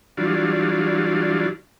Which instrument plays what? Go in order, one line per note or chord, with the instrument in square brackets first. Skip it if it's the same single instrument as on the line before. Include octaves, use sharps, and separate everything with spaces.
[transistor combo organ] E3 F#3 G3 D4 F4